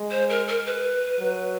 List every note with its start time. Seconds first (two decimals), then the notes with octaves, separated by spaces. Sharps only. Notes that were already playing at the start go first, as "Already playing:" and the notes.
Already playing: G#3
0.10 C5
0.29 A#4
0.47 A#4
0.65 B4
1.20 F#3